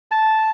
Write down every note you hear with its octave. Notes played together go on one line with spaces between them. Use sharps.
A5